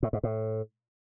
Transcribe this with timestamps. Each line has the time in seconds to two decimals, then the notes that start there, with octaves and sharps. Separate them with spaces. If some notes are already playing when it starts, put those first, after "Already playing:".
0.03 A2
0.13 G#2
0.23 A2